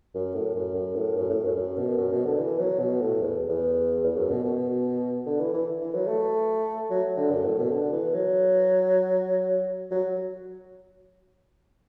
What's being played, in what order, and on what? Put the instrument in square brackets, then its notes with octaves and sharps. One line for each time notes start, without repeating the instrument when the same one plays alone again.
[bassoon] F#2
A2
F#2
F#2
A2
F#2
A2
F#2
F#2
B2
F#2
B2
D3
E3
F#3
B2
A2
E2
E2
E2
F#2
B2
B2
D3
E3
E3
E3
F#3
A3
F#3
D3
F#2
A2
B2
D3
E3
F#3
F#3